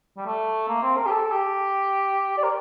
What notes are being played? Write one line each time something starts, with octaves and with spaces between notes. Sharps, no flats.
G3
A3
A#3
C4
A#4
G4
A4
G4
D5
A#4